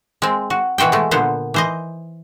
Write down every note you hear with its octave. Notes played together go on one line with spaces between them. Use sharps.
G#3 C4
F#4
B2 E3 F#4 C5 G5
G#3 A3
A#2 D3 B3 C5
E3 C5 D#5